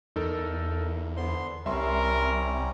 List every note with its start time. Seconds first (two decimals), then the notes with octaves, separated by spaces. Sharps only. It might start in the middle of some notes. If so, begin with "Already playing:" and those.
0.16 E2 D#4 A4 A#4
1.17 D3 B3 C5 C6
1.66 C2 C3 G3 C#4 A#4 E5 C6